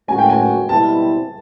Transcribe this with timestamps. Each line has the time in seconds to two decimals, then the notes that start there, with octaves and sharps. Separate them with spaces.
0.08 A2 F#3 A#3 C#4 F#4 G#5
0.19 G5
0.29 G#5
0.69 B2 G3 C4 E4 A5